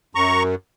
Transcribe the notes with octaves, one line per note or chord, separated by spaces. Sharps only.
F#2 A#5 C#6